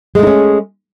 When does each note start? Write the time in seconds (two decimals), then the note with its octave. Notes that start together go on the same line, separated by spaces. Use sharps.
0.15 G#3
0.19 A3
0.23 D#4
0.27 C#4